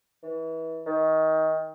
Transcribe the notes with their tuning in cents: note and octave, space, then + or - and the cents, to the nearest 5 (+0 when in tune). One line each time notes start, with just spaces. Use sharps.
E3 -30
D#3 +25